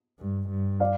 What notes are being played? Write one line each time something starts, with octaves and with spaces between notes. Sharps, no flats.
G2
G2
D5 F5